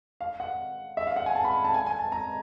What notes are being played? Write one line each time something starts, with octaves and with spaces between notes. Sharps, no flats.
F5
F#5
E5
F5
F#5
G#5
A5
B5
A5
G#5
G#5
A5
A#5